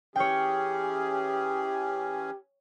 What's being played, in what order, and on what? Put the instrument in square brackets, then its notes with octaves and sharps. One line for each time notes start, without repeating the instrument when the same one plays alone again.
[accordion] E3 C#4 G#4 [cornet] G4 [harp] C#5 G5